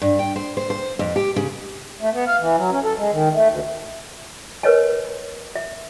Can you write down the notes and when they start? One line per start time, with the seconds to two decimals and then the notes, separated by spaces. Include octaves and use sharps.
0.02 G2
0.19 G5
0.36 C5
0.57 C5
0.70 C5
0.99 F2
1.16 G4
1.36 C#3
2.01 A3
2.13 B3
2.27 F5
2.39 E3
2.57 F#3
2.71 C#4
2.84 A4
2.97 G#3
3.12 D#3
3.34 A3
3.48 D2
4.63 A#4 B4 C#5 D#5 G#5
5.55 E5